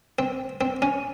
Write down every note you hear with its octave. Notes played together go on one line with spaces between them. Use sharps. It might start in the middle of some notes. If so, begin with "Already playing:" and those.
C4
C4
C#4